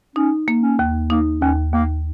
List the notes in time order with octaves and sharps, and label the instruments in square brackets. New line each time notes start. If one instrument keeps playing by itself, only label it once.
[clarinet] C#4 [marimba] D#4
[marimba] A#3
[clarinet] C#4
[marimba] D#2
[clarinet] A#3 [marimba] D#4
[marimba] D#2 [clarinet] C#4
[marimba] D#2 [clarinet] A#3